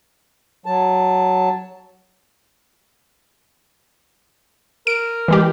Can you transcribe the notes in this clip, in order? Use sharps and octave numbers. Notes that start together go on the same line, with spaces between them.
F#3 A5
A#4 D7
E3 G#3 G4